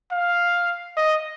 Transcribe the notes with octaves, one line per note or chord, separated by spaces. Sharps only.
F5
D#5